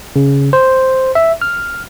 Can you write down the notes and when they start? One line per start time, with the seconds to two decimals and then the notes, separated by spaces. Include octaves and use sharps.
0.16 C#3
0.53 C5
1.15 E5
1.42 F6